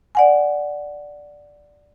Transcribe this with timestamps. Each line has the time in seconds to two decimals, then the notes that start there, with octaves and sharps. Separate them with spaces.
0.15 D5 F#5 G#5